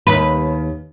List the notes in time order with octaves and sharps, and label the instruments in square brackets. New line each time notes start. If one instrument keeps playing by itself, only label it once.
[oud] D#2 B4